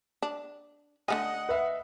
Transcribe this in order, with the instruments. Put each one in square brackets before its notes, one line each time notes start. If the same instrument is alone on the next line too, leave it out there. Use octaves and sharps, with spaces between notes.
[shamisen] D4
[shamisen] D3 A3 G#5 [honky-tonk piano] D#5 D#6 [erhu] F#5
[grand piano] B4 E5